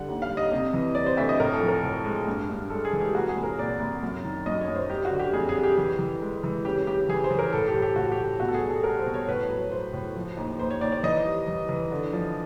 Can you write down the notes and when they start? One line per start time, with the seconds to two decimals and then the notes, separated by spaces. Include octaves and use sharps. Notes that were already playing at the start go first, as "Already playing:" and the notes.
Already playing: D3 G3 F#5
0.08 D#2
0.22 F5
0.29 G3
0.37 D#5
0.52 C3
0.73 E3
0.95 C3 D5
1.06 C5
1.17 D2 E5
1.29 D#5
1.40 A2 A#4
1.53 A4
1.61 F3
1.68 A#4
1.83 A2
2.05 G#3
2.27 G2
2.49 G2
2.70 G#3 A4
2.85 G#4
2.93 E3
3.00 G4
3.14 C2 F#4
3.29 G#4
3.36 C2
3.43 A#4
3.58 A#2 D5
3.80 C2
4.03 F#2
4.24 D#3
4.46 F#2 D#5
4.61 C#5
4.68 F#2
4.76 C5
4.90 G3 G4
5.05 F#4
5.11 D3
5.19 G4
5.33 F2 G#4
5.49 G#4
5.56 G3
5.63 G4
5.77 E3 G4
5.99 E3
6.22 G#3
6.43 E3
6.65 C#3 G4
6.87 C#3 G4
7.09 E3 G#4
7.24 C5
7.30 E3
7.39 A#4
7.53 A2 A4
7.68 G4
7.74 A2
7.82 G4
7.96 A2 F#4
8.12 G4
8.19 A2
8.40 B2 F#4
8.48 A4
8.54 G#4
8.63 G3
8.70 A4
8.84 G3 A#4
8.99 C5
9.05 B2
9.14 C#5
9.28 A2 B4
9.50 F#3
9.71 F#3 C5
9.93 A2
10.16 F3
10.37 D#2
10.59 D#2 C5
10.71 C#5
10.81 D#2 D5
10.92 D5
11.03 E3 D#5
11.25 G3
11.48 E3
11.69 E3
11.92 D3
12.13 F3